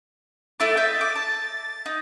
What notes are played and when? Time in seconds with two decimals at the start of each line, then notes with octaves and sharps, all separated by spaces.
0.60 A3 E4 D6 A6
0.77 D#5 E5 G6
1.01 D6
1.15 A5
1.86 D#4